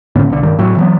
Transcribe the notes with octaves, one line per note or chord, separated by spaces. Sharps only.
A2 D3 B3 C#4
B1 D3
G2 D#3 G3
A2 F#3
E3 F#3 B3